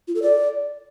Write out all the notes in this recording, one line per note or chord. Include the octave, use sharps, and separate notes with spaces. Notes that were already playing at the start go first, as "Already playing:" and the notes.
F4
A4
D5